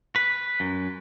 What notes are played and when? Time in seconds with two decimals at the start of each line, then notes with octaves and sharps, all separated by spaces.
0.16 B4
0.60 F#2